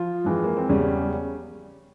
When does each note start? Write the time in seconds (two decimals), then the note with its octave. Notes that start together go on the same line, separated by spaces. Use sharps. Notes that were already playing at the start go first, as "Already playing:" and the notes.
Already playing: F3 F4
0.25 F2 E3 G#3
0.44 A#3
0.57 C4
0.69 E1 E2 C#3 G3 C#4